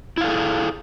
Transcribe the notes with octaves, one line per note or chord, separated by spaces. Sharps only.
E4 G#4 A4 F5